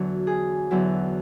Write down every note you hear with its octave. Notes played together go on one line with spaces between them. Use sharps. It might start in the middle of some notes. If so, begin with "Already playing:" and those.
Already playing: E2 D3 F#3 F#4
G#4
E2 D3 F#3 E4